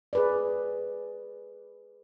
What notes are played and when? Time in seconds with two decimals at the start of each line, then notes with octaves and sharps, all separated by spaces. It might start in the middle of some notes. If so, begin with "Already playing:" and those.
0.13 G#4 B4 D5